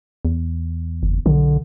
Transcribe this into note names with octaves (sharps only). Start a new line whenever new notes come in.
E2
F#1
B1 D3